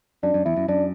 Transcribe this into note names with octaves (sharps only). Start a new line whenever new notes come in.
F#2 D4
F#2
E2 E4
F#2
F#2 D4